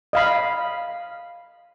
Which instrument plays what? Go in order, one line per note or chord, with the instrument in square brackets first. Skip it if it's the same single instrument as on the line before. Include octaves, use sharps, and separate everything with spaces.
[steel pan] D#5 F5 B5